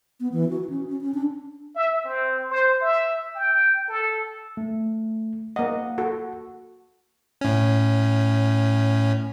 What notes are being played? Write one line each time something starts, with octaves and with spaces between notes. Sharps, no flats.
B3
E3
F#4
C#4
C#4
C#4
D4
E5
C4
C5
E5
G5
A4
A3
A#3 D#5 F#5
F#4 A4
A2 C#4